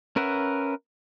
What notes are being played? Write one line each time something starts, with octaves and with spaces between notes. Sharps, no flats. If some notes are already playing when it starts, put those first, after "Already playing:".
C#4 A#4 B4 E5 F#5